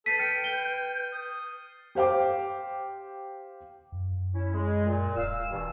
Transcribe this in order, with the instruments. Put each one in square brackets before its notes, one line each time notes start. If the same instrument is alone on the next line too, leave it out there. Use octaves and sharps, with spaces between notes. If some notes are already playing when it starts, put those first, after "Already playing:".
[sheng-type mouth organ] A4 [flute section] B4 G6 [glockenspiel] A6 C7 D#7 [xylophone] B6
[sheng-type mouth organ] G5 [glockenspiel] F6 C#7
[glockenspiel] G7
[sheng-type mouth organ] D#6
[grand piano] G4 C5 F5 G5 D6
[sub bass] F#2
[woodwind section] C#4 E4
G#3
A#2
[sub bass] D1 [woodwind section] F5 E6
[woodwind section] G2 B2 E3